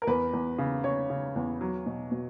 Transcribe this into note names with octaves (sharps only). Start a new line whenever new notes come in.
A#4
E2 B4
E2
C#3
C#3 C#5
C#3
E2
F#3
B2
B2